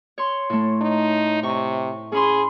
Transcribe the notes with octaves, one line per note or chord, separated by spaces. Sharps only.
C#5 C6
A2 A3
D#4
C3 C#6
C#4 G#4 B5 C6